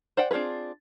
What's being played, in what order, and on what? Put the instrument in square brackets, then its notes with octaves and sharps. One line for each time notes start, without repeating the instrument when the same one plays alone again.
[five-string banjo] C5 D5 F#5 G5
C4 D4 F4 G#4 B4